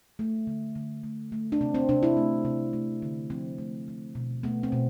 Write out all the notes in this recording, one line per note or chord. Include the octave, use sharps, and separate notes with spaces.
A3
D3
D3
A3
A3
D4
C3 C4
C4
C3 D4
E4
A3
C3
A3
D3
F3 C4
A3
A3
B2
A3 B3
C4
B2